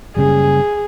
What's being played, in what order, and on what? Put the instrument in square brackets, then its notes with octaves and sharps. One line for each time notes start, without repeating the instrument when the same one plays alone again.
[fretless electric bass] F#1 C#3 G3 [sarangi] G#4